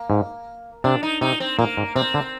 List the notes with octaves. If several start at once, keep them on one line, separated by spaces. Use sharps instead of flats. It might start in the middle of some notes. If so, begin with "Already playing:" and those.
Already playing: A#3
G#2
C3 D4
D#4
C3 D#4
C4
A#2 A#3
G#2
C3 C4
D3